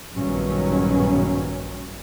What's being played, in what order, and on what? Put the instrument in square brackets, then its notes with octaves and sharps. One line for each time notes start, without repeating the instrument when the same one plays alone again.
[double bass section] A#1 G2 B2 D#3 F#3 C#4